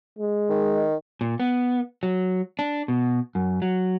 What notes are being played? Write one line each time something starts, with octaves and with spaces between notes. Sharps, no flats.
G#3
D#3
A#2
B3
F#3
D4
B2
F#2
F#3